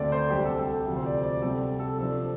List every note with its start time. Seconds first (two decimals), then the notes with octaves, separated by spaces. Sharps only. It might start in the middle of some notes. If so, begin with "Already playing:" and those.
Already playing: D2 D3 A3 C4 D5
0.12 C5
0.30 C2 C3 G3 D4 G4
0.45 A4
0.59 A4
0.73 G4
0.86 D2 C3 F3 A4
0.96 C5
1.06 D5
1.24 D5
1.42 C3 G3 C4 A4
1.79 A4
1.98 C3 F3 D4 A4